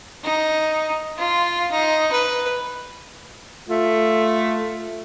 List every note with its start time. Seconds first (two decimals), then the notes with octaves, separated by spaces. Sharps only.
0.24 D#4
1.17 F4
1.72 D#4
2.12 B4
3.69 A3 F4